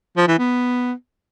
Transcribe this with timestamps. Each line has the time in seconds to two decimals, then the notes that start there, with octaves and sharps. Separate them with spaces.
0.17 F3
0.28 E3
0.38 B3